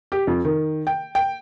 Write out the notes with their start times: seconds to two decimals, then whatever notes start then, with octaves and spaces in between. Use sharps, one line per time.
0.12 G4
0.27 F2
0.45 D#3
0.87 G5
1.15 G5